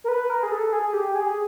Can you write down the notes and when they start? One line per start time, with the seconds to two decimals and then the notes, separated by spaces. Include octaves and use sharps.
0.04 A#4
0.08 B4
0.30 A#4
0.43 G#4
0.52 A4
0.73 G#4
0.93 G4
1.15 G#4